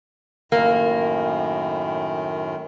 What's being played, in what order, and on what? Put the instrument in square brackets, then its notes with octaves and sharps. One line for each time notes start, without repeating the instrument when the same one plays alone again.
[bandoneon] F#2 A2 D#3 [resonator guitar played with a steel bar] A#3